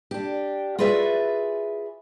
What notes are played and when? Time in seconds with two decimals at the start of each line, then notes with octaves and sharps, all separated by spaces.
0.11 D4 G4
0.79 F4 F#4 G#4 B4 D5 E5